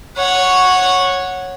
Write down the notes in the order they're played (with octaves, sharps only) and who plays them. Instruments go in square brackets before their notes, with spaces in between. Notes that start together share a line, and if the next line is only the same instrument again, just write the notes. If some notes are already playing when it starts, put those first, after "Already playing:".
[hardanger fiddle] C#5 F#5